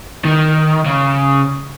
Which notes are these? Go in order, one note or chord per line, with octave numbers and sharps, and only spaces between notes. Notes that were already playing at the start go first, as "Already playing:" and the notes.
D#3
C#3